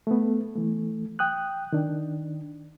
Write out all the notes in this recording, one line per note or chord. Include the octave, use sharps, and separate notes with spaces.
A3 B3
E3 A3
G5 D#6 F#6
D#3 D4